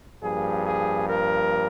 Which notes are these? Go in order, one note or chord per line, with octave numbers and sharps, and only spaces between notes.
G2 F3 A#3 G#4
G#4
A#4